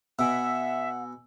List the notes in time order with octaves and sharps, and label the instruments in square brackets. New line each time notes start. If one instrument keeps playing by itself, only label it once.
[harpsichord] B2 [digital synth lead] E5 [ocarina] F#5 [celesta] G#5 E6